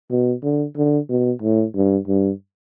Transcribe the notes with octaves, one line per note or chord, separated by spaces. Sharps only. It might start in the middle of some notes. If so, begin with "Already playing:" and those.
B2
D3
D3
B2
A2
G2
G2